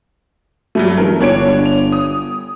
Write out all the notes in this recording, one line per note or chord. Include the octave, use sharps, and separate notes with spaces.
F#3 G3 A3
E1 A#4
G1 D4 C#5 D7
F7
D#6